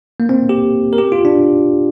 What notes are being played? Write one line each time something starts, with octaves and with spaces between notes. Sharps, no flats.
A#3
C4
G4
A#4
G4
F4
D4